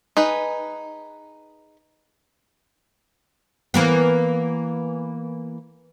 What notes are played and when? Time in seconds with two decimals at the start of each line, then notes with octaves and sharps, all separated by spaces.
0.17 D#4 G#4 B4
3.74 E3 A#3 B3